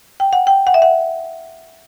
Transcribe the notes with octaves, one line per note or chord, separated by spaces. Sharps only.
G5
F#5
G5
F#5
E5
F#5